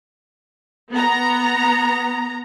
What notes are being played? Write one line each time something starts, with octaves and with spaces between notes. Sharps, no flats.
B3 A#5